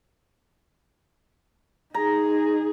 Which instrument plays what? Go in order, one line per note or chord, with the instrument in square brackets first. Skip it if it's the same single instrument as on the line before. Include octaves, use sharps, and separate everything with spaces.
[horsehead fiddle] D#4 G#4 [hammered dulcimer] A#5